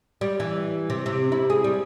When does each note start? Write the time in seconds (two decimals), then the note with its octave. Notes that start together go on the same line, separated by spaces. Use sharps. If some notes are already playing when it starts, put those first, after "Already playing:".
0.21 G3
0.40 E3
0.90 C3
1.06 C3
1.32 E4
1.50 G#4
1.64 G3